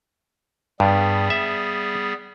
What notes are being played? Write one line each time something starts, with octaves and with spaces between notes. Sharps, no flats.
G2 G3 B3 G#4
E5